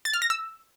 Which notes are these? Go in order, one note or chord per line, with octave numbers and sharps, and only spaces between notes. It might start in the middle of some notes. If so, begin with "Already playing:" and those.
A6
F6
A#6
E6